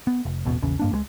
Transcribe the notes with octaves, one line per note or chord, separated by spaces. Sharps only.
B3
F1
A1 E2 B2
A#1 E2 C#3
G2 A#3 D4
C#2 F#3 G#3